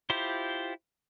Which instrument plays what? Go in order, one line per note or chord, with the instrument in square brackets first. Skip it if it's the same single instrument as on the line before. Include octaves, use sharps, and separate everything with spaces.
[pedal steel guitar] E4 F4 G4 C5